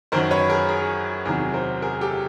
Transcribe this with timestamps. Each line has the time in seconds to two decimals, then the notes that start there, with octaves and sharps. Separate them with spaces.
0.12 F#2 D#3 F#3 A#4 C5
0.31 B4 C#5
0.50 G#4 A#4
0.69 G#4 A#4
1.25 E2 C3 D#3 F#3 G#4 A#4
1.54 A#4 C5
1.82 G#4 A#4
2.01 G4 A4